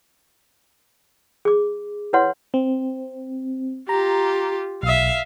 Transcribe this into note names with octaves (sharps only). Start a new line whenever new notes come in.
G#4 D6
E4 B4 C#5 F#5 C6
C4
F4 G4 A#5
B1 E5 F5